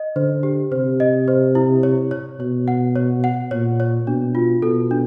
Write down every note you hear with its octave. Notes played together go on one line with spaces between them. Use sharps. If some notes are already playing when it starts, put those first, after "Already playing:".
Already playing: D#5
D3 C5
G4
C3 C5
D#5
C5
E4
C#5
C#5
B2 C#5
F#5
C#5
F#5
A#2 C#5
C#5
B2 D4
F4
B2 A4
D4